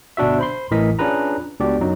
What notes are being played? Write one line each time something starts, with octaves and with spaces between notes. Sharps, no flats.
G1 B2 D4 F#4 E5
C5 B5 C6
A1 A2 E3 A#4 D#5 B6
C#4 D4 F4 G#4 B4 A#5
C#2 B3 D4 F#4 G4 D5
F#2 F#3 D#4